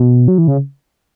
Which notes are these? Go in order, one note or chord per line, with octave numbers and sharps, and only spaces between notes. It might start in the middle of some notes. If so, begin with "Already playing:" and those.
Already playing: B2
F#3
E3
C#3